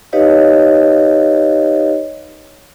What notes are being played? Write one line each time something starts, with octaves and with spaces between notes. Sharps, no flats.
D#4 G4 B4 C#5 D#5 F5